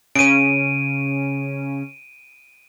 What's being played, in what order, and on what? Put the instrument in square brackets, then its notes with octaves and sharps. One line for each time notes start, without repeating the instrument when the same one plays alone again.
[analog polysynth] C#3 C#4 [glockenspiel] D7 D#7